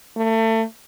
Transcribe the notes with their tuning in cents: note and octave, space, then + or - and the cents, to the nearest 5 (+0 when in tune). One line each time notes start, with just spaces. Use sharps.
A3 +30